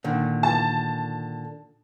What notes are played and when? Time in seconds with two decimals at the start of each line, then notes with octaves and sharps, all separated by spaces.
0.04 A#2 D3 D#3
0.43 A5